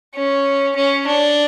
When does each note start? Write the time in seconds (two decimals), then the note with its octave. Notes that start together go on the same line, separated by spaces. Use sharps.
0.15 C#4
0.76 C#4
1.07 D4